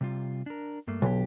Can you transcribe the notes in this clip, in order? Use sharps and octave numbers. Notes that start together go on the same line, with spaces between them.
C3 G3 F4
D4 A#4
G2 A3 A#3
B1 D3 G4